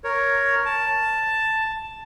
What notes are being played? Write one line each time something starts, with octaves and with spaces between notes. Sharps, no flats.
A#4 C#5
A5